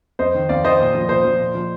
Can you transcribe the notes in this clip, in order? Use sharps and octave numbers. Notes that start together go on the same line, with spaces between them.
F2 C5 D#5
D#3
F2 D5 F5
D#3 C5 D#5
A#2
F3
A#2 C5
F3
A#2
F3